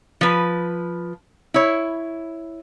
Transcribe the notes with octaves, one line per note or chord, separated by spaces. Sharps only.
F3 B4
E4 C#5